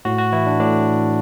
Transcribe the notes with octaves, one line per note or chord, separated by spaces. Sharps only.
A2 F#4
F#4
E3 E4
D4
A2 D4